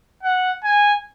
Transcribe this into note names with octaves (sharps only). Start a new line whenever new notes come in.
F#5
G#5